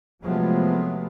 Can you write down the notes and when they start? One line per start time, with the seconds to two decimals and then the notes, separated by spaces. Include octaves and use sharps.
0.24 C3 F3 F#3 G#3 A3 B3